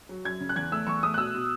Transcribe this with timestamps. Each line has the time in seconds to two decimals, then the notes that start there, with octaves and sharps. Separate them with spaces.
0.09 F#3
0.25 F#2 G#6
0.40 C#3
0.49 F#6
0.56 E2 G#6
0.72 A3 E6
0.87 E2 C#6
1.03 A3 D#6
1.14 F#6
1.18 B2 E6
1.34 B2